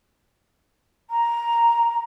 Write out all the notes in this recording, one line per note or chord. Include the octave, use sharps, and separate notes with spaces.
A#5